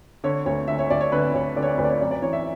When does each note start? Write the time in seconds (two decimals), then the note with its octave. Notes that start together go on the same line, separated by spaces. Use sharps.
0.24 D3 C#5
0.46 D2 C#5
0.68 D3 E5
0.79 C#5
0.90 D2 D5
1.01 C#5
1.12 D3 B4
1.34 D2 C#5
1.56 D3 D5
1.62 C#5
1.67 D5
1.78 D2 B4
1.84 D5
1.89 C#5
2.01 F#2 D5
2.11 D5
2.22 E3 C#5
2.33 E5